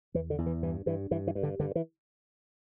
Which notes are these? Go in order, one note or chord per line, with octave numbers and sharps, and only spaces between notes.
E2 E3
D3
E2
E3
G2 E3
G2 E3
G2 E3
E3
G2
D3
G2 D3
E3